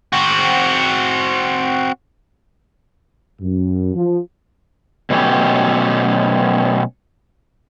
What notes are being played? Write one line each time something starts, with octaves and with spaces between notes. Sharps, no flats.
C4 F#4
F#2
F3
B2 F#3 A3 C#4 G4